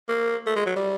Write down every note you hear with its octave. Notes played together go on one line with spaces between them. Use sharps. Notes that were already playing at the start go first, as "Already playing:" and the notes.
A#3
A3
G#3
F#3
G3